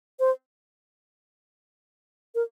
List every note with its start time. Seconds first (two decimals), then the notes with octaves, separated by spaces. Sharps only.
0.20 C5
2.35 A#4